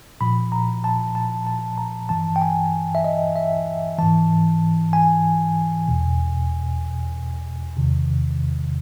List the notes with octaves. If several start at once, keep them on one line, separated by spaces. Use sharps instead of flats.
A#2 F3 B5
A#5
A5
A5
A5
A#5
G2 E3 A5
G5
G#5
E5
D#5
E5
G#2 E3 A5
G#5
E2 B2
E2 C3 D#3